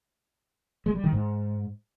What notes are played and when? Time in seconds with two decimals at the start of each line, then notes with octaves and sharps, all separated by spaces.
0.86 G#3
0.95 G3
1.04 D#3
1.13 G#2